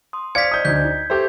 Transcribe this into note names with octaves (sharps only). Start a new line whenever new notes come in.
C6 D#6
C5 D5 F5 F6 G#6 B6 C#7
C5 D5 D#5 D#6 G6
D2 D#4 G6 G#6 B6
D#4
G4 A4 C5 E5 G5 C#6